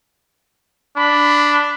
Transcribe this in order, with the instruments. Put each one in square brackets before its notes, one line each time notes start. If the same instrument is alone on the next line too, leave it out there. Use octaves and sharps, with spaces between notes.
[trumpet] D4 [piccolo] B5